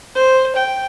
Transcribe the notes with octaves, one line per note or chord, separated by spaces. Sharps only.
C5
G5